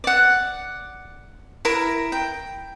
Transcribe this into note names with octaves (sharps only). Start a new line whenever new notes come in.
D5 F#5
E4 A#4 A#5
G5